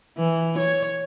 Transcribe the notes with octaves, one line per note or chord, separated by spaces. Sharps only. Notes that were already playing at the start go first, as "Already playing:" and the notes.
E3
C#5